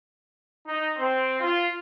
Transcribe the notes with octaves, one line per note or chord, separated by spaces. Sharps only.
D#4
C4
F4